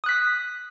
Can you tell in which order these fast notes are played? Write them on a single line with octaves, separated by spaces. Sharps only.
D#6 F#6 B6